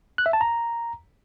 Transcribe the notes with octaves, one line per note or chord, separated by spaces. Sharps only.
F#6
E5
A5
A#5